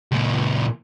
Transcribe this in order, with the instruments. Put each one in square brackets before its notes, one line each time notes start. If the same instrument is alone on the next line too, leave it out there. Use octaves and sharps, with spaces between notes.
[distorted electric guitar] C#2 A#2